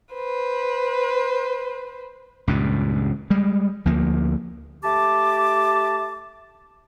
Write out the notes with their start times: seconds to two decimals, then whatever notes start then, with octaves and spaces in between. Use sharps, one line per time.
0.13 B4 C5
2.48 C#2 G2 A#2
3.30 G3 G#3
3.85 D2 F3 A#3
4.83 A3 G4 A5 D6